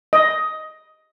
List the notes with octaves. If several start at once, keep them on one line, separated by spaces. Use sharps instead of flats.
D#5